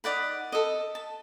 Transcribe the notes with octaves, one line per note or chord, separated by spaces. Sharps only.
D#4 D5 F#5 B5
A4 D#5
A5